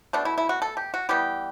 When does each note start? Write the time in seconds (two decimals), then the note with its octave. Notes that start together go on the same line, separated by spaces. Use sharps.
0.13 B2 A3 D4
0.25 E4
0.38 E4
0.49 F#4
0.62 A4
0.77 G4
0.94 F#4
1.09 E3 G3 B3 G4